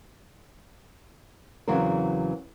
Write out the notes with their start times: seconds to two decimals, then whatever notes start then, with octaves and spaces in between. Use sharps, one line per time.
1.68 E2 C#3 E3 F#3 C4 A#4